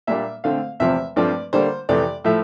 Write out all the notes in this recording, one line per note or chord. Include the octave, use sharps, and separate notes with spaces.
A#2 G3 A#3 D4 E5
D3 A3 C4 F5
E2 C3 F3 C4 E5
G2 F3 A3 C4 D5
D3 G3 A#3 D4 C5
F2 C3 E3 A3 D5
A2 F3 A3 E5